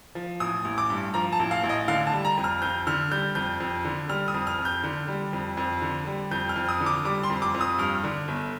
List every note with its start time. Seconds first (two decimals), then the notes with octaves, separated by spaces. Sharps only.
0.15 F3
0.40 A1 D#6
0.65 A1
0.78 D6
0.90 G2
1.14 F3 A#5
1.33 A5
1.39 A1
1.51 F5
1.64 A1
1.69 D#5
1.88 D3 F5
2.07 A5
2.13 G3
2.25 A#5
2.37 F2
2.44 F6
2.62 F2 G6
2.87 D3 F6
3.11 G3 G6
3.35 F2 G6
3.60 F2
3.85 D3
4.09 G3 F6
4.28 D#6
4.34 F2
4.47 F6
4.59 F2
4.65 G6
4.84 D3
5.08 G3
5.33 F2
5.57 F2
5.82 D3
6.07 G3
6.31 F2 G6
6.49 F6
6.56 F2
6.69 D#6
6.80 D3
6.86 D6
7.05 G3 D6
7.23 C6
7.30 F2
7.42 D6
7.54 F2
7.61 D#6
7.78 G2 F6
8.04 D3
8.28 G1